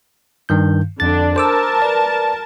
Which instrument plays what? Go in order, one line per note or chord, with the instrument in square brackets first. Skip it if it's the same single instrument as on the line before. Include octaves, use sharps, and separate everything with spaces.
[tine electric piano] G2 D#3 G6
[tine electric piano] F2 A6 [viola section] D3 D4
[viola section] A#4 A5 [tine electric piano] C5 D6 E6
[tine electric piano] B4 D5